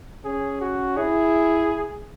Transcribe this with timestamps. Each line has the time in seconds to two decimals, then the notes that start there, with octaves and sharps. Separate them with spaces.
0.25 C#4 G#4
0.61 F#4
0.97 E4 G#4